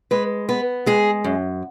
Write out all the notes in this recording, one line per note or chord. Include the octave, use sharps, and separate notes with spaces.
G#3 B4
B3 B4
G#3 G#4
F#2